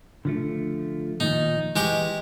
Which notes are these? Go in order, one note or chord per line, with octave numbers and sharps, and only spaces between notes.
D3 F3 A3
A#2 D#3 F3 D#4
E3 G#3 G4 C#6